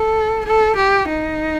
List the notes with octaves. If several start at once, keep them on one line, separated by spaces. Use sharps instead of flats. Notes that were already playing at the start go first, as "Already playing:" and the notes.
Already playing: A4
A4
G4
D#4